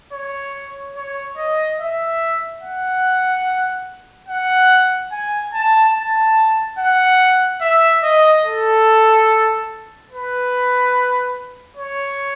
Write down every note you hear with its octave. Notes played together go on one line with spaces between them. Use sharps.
C#5
C#5
D#5
E5
F#5
F#5
G#5
A5
A5
F#5
E5
D#5
A4
B4
C#5